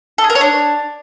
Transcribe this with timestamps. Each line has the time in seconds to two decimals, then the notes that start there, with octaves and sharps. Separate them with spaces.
0.18 A4
0.24 G#4
0.30 A#4
0.35 C#5
0.41 D4